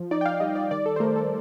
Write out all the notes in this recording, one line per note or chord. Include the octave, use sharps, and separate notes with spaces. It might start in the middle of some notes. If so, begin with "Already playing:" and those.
Already playing: F3
D#4 D5
G5
F5
G3 D#5
D5
D#3 D5
A4
C5
A3 A#4
A4